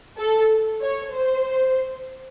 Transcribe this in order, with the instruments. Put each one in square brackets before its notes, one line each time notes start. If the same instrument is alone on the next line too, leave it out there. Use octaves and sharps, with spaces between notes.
[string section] A4
C#5
C5